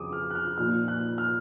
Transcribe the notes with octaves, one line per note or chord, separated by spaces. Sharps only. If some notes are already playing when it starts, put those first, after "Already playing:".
Already playing: F2 C#3 F3 D6 D#6
F6
F#6
F6
A#2 F3 A#3 D#4 F6
F#6
F6